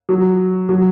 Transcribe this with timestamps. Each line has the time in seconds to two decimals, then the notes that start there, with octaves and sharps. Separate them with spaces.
0.09 F#3
0.69 F#3